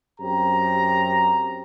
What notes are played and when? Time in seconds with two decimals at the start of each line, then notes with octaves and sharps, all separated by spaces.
0.19 F#2 C4 G4 A#5